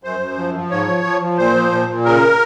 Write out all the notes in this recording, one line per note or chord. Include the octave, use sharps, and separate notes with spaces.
F#2 C5
F#2
F3
F3
G#2 C#5
F3
F3
F3
A#2 C5
F3
A#2
A#2
C#3 A#4